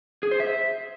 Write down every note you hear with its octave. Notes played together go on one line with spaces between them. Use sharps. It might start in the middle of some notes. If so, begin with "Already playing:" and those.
G#4
C5
E5